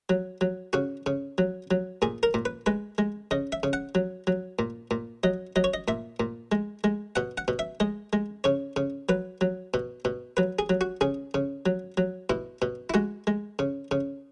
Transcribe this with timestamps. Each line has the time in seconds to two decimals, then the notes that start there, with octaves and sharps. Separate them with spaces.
0.09 F#3
0.41 F#3
0.73 C#3 F#4
1.06 C#3
1.38 F#3
1.71 F#3
2.02 A#2 G#4
2.23 A#4
2.34 A#2
2.45 B4
2.66 G#3 B4
2.98 G#3
3.31 C#3 D#5
3.52 E5
3.63 C#3
3.73 F#5
3.95 F#3
4.27 F#3
4.59 A#2
4.91 A#2
5.23 F#3 D#5
5.56 F#3 D#5
5.64 C#5
5.74 D#5
5.88 A#2 E5
6.20 A#2
6.52 G#3
6.84 G#3
7.16 B2 F#5
7.38 F#5
7.48 B2
7.59 E5
7.80 G#3 D#5
8.13 G#3
8.44 C#3 C#5
8.76 C#3
9.09 F#3 B4
9.41 F#3
9.74 B2
10.05 B2
10.37 F#3 B4
10.59 G#4
10.69 F#3
10.81 F#4
11.01 C#3 G#4
11.34 C#3
11.66 F#3
11.97 F#3
12.30 B2 E4
12.62 B2
12.90 E4
12.94 G#3 F#4
13.27 G#3
13.59 C#3
13.91 C#3